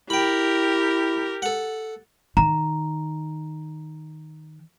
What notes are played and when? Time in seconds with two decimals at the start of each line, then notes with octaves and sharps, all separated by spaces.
0.10 E4 G4 A#4 G5 B5
1.42 A4 F#5
2.37 D#3 A#5